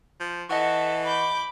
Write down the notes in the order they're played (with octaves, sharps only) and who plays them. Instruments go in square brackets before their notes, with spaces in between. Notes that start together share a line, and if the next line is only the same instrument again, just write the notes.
[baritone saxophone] F3
[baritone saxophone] E3 [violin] A4 E5 [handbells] D#5 F#5 C#6
[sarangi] B5 [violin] D6 G6